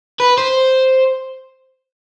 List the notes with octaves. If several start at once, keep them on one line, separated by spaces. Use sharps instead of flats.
B4
C5